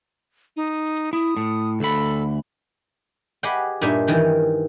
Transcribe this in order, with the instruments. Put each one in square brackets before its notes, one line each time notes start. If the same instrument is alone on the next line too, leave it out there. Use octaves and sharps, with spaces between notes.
[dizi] D#4
[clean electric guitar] E4 [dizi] D#6
[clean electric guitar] A2
[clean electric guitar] D2 B5 [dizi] A4
[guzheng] G4 G#4 B4 D#5 F#5 G5
G2 A#2 D#4 E5 G#5
D#3 E3 G5